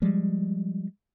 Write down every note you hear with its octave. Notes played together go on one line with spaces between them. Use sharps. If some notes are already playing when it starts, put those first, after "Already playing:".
F3 G3 G#3